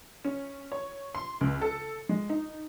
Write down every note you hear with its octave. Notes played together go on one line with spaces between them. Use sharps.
C#4
C#5
C6
C#2
A4
G#3
D#4